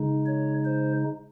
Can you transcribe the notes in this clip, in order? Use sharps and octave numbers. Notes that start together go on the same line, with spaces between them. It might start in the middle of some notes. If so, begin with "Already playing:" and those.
Already playing: C#3 G#3 D#4
C#5
C5